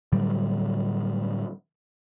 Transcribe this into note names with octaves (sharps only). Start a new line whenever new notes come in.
A2 D3 F#3 G3